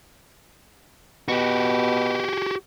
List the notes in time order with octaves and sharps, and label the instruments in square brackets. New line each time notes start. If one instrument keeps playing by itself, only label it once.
[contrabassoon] B2 [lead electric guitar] F#4 G4